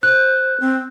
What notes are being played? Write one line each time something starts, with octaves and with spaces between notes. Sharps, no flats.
C5 F#6
C4